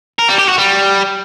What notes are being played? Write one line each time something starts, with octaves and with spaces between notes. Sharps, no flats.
A#4
G3
G4
F#4
G3